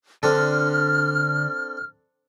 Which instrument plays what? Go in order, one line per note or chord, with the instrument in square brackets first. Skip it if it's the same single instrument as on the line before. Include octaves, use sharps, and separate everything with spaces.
[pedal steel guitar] D3 [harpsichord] C4 D4 A4 [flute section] F6